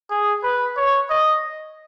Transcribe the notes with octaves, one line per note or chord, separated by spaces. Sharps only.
G#4
B4
C#5
D#5